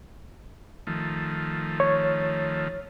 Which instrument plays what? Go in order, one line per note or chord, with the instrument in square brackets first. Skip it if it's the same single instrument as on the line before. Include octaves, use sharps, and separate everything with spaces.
[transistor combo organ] D#3 F3 A3
[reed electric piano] C#5